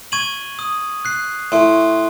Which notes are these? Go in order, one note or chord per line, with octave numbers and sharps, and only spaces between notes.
C#6 G#6 D#7 F#7
D#6
F#6 C7
A2 C6